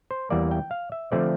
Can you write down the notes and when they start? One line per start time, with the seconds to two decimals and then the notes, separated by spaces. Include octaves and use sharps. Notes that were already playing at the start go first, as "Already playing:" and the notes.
0.11 C5
0.30 E2 E3 G3 A#3 D5
0.51 G5
0.71 F5
0.92 E5
1.12 D3 F3 A3 C4 D5